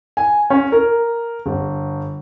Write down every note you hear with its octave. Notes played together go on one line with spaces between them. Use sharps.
G#5
C#4
A#4
G1